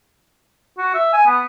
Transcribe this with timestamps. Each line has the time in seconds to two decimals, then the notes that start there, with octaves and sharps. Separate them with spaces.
0.78 F#4
0.94 E5
1.13 G#5
1.26 B3